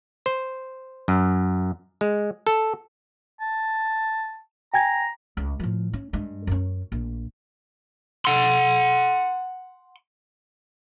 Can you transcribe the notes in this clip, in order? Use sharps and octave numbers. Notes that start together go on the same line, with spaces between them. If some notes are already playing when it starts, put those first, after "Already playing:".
C5
F#2
G#3
A4
A5
G5 G#5 A#5 G#6
C#2
A2 F3
C#4
G2 G#3
F#2 C#4
A#1
F#5 C6